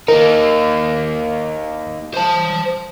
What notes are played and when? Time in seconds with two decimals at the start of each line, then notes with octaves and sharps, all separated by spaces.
0.08 A#3 D#4 A#4
2.14 C5 A5